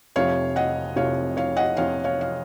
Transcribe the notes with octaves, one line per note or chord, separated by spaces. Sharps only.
F1 F2 C3 F3 C#5 F5
D#5 F#5
F1 F2 C3 F3 C#5 F5
C#5 F5
D#5 F#5
F1 F2 C3 F3 C#5 F5
C#5 F5
F5